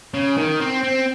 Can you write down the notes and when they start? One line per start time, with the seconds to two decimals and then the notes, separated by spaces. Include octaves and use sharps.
0.14 C#3
0.37 D#3
0.60 C4
0.83 C4